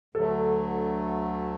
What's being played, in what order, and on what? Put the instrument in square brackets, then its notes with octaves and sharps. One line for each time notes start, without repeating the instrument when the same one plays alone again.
[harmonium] D2 D3 F#3 A3 [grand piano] A4